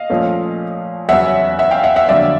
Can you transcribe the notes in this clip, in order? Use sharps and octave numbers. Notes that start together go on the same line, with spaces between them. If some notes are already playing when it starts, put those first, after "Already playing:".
Already playing: D#5 F5
A#2 F3 A3 C#4
E2 C#3 F#3 E5 F#5
E5 F#5
F5 G5
E5 F#5
E5 F#5
F2 D3 F#3 A#3 D5 E5